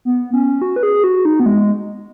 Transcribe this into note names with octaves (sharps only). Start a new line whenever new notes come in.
B3
C#4
F#4
B4
G#4
F#4
D#4
B3
G#3